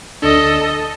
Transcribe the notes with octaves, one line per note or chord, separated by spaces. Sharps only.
D2 D4 A4 D#5
A5